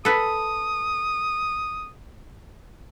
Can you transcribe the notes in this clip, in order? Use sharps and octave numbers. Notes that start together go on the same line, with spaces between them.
A4 B4 D#6